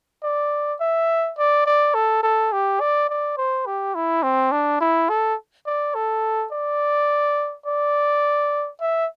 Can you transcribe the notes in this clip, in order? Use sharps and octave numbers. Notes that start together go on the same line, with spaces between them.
D5
E5
D5
D5
A4
A4
G4
D5
D5
C5
G4
E4
C4
D4
E4
A4
D5
A4
D5
D5
E5